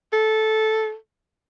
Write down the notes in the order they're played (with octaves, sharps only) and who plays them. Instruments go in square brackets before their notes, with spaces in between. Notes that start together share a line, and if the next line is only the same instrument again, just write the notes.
[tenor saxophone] A4